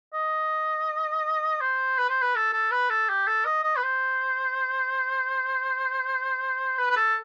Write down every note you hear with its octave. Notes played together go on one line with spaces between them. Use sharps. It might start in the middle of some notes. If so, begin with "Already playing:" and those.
D#5
C5
B4
C5
B4
A4
A4
B4
A4
G4
A4
D#5
D#5
B4
C5
B4
B4
A4